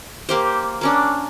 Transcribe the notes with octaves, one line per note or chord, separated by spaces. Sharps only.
A#3 G4 C5
A#3 C#4 D4